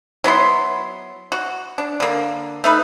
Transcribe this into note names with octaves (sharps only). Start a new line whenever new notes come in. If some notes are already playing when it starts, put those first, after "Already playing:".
F#3 B3 E4 C6
F#4
D4
D3 A#3
A3 D#4 B4